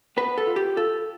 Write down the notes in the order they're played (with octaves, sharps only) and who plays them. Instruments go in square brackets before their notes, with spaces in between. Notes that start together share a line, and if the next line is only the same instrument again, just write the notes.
[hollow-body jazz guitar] B3 B4
A4
F4
G4
F4 A4